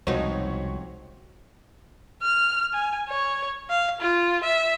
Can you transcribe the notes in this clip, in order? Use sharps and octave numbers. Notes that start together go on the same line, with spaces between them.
C2 F2 B2 G#3 D#4 F#4 C5 C#5
F6
G#5
C#5
F5
F4
E5